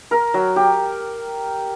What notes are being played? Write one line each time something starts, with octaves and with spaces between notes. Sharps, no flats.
A#4
F#3
G4